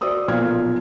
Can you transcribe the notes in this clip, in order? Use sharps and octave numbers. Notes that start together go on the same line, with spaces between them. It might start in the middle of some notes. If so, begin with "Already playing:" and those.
F#4 C5 D5 D#6 E6
B1 A#2 F3 B3 F6 G#6